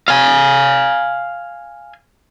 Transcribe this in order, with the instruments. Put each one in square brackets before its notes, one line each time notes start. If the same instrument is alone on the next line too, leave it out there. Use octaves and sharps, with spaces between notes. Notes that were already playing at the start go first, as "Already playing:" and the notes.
[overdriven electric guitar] F5 G#5